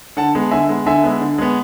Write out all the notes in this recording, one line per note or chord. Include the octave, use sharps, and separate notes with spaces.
D3 F#5 A5
G#3 B3
D3 E5 G#5
G#3 B3
D3 E5 G#5
G#3 B3
D3
G#3 B3